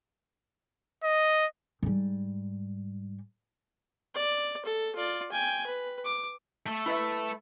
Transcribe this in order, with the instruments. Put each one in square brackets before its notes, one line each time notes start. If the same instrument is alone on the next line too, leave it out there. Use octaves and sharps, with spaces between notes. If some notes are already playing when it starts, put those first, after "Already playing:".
[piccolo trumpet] D#5
[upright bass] G#2 G3
[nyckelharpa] D5
A4
F4 D5
G5 G#5
B4
D6
[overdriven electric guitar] A3 A4
[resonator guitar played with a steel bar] E4 B4 E5